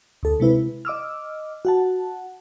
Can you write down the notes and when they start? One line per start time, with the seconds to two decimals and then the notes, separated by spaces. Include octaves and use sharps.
0.23 D2 A4
0.40 C3 G#3 E4 B4
0.85 D#5 D6 E6 F6
1.65 F#4 F#5 A5